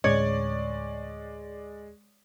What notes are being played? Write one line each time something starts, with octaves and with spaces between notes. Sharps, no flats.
D2 A2 G#3 C#4 C#5 D5